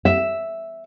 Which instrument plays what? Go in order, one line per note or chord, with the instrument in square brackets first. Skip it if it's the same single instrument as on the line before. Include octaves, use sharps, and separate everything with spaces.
[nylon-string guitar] E5